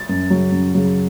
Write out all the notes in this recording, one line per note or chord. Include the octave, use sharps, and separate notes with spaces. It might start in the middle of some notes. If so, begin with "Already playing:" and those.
Already playing: A6
F#2
C#3 F#3
F#2
C#3 F#3